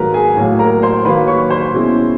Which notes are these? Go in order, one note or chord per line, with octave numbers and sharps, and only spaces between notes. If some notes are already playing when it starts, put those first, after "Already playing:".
Already playing: G#2 D#3 F#3 A#3 A#4 B4 A#5
G#4 G#5
A2 F#3 A#3
A#4 A#5
C5 C6
D#3 F#3 A#3 B4 B5
C#5 C#6
C5 C6
B2 G#3 C#4 E4